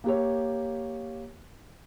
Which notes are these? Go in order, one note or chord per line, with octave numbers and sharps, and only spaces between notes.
A#3 G4 C#5